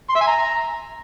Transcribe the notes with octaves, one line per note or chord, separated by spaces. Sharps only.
C6
E5
G#5
A#5